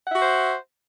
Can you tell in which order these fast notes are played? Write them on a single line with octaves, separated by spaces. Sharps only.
F#5 E5 F#4 C5